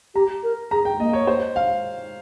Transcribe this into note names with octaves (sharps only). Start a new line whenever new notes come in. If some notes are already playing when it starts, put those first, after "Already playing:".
G4 A#5
A#4
G#4 A#5
G5
A#3 D#5
C#5
C5
F5